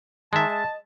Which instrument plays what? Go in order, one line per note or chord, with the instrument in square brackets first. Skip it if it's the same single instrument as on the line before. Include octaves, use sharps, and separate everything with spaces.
[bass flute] D#3 [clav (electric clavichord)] G#3 E5 [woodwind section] A5
[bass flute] D#5